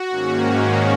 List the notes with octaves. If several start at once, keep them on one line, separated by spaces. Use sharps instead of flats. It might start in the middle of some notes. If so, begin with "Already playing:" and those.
Already playing: F#4
G#2 D#3 A#3 C#4